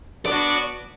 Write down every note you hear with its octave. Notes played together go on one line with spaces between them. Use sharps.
B3 D4 F#4 D5